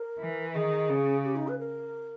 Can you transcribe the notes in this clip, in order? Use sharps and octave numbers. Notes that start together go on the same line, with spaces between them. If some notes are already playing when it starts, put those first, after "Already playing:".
Already playing: A#4
E3
D#3 G#4
C#3
G4
D#4
B4
A#4